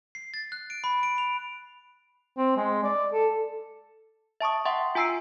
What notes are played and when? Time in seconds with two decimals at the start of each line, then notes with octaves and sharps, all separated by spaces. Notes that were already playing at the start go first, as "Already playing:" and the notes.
0.15 C7
0.34 A6
0.52 F#6
0.70 D7
0.84 B5
1.03 D7
1.18 F7
2.37 C4
2.57 G#3
2.83 D5
3.13 A4
4.41 E5 A5 C#6 D#6
4.65 E5 F#5 G5 C6
4.95 F4 G#5 A#5 E6 C7 D7